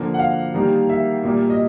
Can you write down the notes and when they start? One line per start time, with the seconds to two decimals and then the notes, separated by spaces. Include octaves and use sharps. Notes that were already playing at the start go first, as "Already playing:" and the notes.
Already playing: D3 F3 A#3
0.14 F#5
0.19 F5
0.54 D#3 G3 A#3
0.89 E5
1.23 A#2 G3 A#3
1.50 D#5